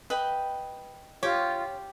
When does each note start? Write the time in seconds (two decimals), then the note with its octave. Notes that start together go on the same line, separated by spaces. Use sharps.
0.10 B4 D#5 G5
1.23 F4 G4 C#5